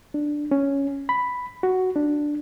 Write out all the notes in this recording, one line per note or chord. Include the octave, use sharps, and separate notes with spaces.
D4
C#4
B5
F#4
D4